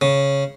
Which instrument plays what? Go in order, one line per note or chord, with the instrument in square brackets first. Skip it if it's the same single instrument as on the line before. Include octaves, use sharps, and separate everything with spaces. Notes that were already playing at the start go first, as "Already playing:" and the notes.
[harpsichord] C#3